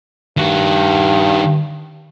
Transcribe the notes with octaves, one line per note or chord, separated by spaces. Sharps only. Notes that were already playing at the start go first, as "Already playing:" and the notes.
G2 D#3 F#4